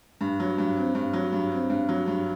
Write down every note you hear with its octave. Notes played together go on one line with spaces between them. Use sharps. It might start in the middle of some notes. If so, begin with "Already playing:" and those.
G2
F#3
G2
C4
G2
F#3
G2
C4
G2
F#3
G2